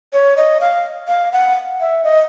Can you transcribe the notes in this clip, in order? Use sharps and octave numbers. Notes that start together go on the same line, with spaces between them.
C#5
D#5
F5
F5
F#5
E5
D#5